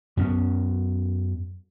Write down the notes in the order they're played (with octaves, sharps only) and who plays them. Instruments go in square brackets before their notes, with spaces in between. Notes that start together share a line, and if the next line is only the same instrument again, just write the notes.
[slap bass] F#2 B3 C#4